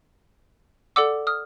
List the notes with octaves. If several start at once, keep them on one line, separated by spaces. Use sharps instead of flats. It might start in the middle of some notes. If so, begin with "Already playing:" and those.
A4 D5 F#5 D6 E6
D#6 F6